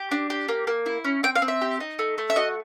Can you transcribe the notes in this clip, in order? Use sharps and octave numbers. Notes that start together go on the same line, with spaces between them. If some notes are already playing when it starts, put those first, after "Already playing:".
Already playing: G4
D4
G4
A#3
A#3
E4
C#4
C4 G5
F5
C4
E5
G4
D#4
A3
A3
E5
F#4 D#5